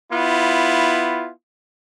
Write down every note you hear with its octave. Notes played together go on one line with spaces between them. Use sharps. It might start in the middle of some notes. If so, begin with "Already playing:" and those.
B3 E4 F4